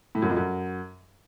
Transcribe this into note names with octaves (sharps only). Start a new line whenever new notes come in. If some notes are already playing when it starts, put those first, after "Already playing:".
A2
F#2
F2
F#2